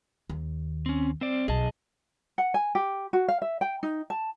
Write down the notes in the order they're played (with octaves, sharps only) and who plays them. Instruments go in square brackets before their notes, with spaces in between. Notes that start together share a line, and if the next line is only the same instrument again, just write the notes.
[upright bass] D#2
[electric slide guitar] C4 C#4
C4 C5 D5
[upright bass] B1 [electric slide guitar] G#4 D#5 A5
[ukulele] F#5
G#5
G4
F#4
F5
E5
G5
D#4
A5